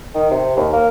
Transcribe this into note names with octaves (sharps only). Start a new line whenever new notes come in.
D#3
C3
D#2
A#3